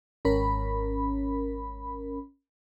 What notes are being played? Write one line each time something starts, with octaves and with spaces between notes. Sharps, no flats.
G#1 C#4 A#4 B5